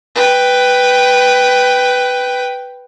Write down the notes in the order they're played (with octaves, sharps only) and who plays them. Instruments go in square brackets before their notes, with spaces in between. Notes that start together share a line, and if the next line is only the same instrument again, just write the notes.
[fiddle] B4 G5